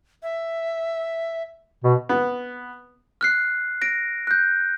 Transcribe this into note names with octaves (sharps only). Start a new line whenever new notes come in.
E5
B2
B3
F6 F#6 C7
A#6 D7
F#6 G6